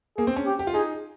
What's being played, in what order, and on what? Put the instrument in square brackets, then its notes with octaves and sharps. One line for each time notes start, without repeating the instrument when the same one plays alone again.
[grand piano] A#3 [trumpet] G#4
[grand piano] C4
C#4
[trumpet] G4
[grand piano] G4
F4
[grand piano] D#4 [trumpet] G#4